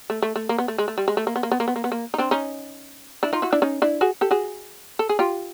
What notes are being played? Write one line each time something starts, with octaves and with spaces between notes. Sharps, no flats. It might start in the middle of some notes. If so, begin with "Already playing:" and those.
A3
A3
A3
A#3
B3
A3
G#3
A3
G3
G#3
A3
A#3
B3
A#3
B3
A#3
B3
A#3
B3
A#3
D#4
C4 D4
C#4 D#4
D4 E4
D#4 F4
E4 F#4
D4 E4
C#4 D#4
D4 E4
F#4 G#4
G4 A4
F#4 G#4
A4
G#4
F4 G4